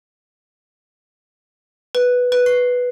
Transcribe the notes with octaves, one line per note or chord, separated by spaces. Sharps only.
B4
B4
C7